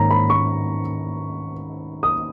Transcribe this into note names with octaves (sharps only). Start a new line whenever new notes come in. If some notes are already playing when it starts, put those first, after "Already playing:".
Already playing: G#2 D#3 A#3 C#4 A#5
B5
C#6
D#6